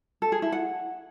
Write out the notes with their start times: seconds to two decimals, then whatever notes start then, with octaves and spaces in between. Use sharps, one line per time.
0.22 A4
0.32 G#4
0.42 E4
0.52 F#5